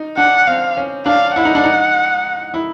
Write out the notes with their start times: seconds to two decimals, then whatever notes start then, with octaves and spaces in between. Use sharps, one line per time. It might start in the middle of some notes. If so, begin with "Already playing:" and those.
Already playing: D#4
0.17 D4 F#5
0.47 C4 F5
0.77 C#4
1.06 D4 F5
1.36 E4 F#5
1.45 D#4
1.55 D4
1.64 D#4
2.54 E4